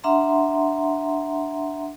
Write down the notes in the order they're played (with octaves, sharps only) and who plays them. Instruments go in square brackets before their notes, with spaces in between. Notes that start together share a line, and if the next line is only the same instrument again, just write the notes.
[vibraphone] D4 E5 F#5 A#5 C6